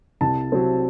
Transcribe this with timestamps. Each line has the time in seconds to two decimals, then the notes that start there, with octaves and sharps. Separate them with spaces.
0.21 C2 A5
0.52 C3 F#3 C4